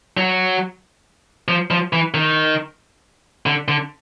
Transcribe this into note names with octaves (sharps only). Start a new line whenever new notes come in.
F#3
F3
F3
E3
D#3
D3
D3